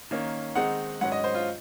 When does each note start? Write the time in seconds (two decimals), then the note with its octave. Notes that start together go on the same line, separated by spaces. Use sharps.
0.11 D#3 A#3 C#4
0.55 D#3 G#3 C4 D#4 F#5
1.01 G#2 F#3 C#4 F#5
1.12 D#5
1.24 C5
1.35 F4